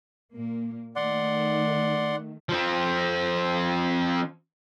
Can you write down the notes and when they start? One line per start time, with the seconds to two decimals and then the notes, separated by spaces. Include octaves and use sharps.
0.33 A#2 A#3
0.96 D#3 A3 D5 F#5 C6
2.49 F3 C4